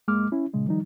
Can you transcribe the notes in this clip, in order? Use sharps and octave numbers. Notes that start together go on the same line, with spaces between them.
F#2 G#3 A#3 D6 F6
C#4 E4
A#2 C#3 G#3
D#3 F3 G3 D#4